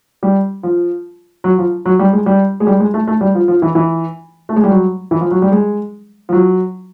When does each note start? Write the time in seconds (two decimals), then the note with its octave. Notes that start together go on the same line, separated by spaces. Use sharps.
0.23 G3
0.63 F3
1.44 F#3
1.58 F3
1.86 F#3
1.99 G3
2.13 G#3
2.26 G3
2.60 G#3
2.67 G3
2.80 G#3
2.94 A3
3.08 A3
3.21 G3
3.35 F3
3.48 F3
3.62 E3
3.75 E3
4.49 A3
4.56 G#3
4.64 G3
4.71 F#3
5.11 E3
5.21 F3
5.31 F#3
5.42 G3
5.52 G#3
6.29 F3
6.33 F#3